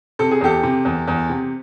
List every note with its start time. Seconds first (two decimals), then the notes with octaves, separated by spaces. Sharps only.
0.19 C3 A4
0.31 G#4
0.41 E2 G4 A4
0.63 C3
0.85 E2
1.07 E2
1.29 C3